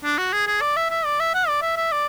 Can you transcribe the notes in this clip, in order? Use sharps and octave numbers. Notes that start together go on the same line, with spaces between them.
D4
F#4
G#4
G#4
D5
E5
E5
D5
E5
F#5
D5
E5
E5
D5